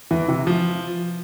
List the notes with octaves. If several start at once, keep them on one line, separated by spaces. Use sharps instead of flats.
E2 E3
C3 E3
F3